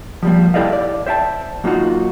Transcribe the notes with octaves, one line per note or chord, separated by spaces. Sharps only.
F3 G3 A#3
E4 G4 A4 D5 D#5 F5
D5
C5 E5 G5 A5
F#3 A#3 D#4 F4 F#4